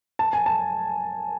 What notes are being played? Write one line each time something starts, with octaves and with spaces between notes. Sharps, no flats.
A5
G#5
A5